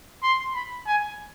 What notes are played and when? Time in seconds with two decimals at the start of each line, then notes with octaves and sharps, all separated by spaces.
0.23 C6
0.55 B5
0.87 G#5